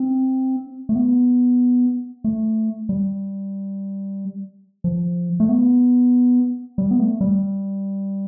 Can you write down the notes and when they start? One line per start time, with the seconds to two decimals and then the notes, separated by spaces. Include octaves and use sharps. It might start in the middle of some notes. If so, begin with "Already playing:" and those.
Already playing: C4
0.89 A3
0.95 B3
2.24 A3
2.89 G3
4.84 F3
5.40 A3
5.49 B3
6.78 G3
6.91 B3
7.00 A3
7.21 G3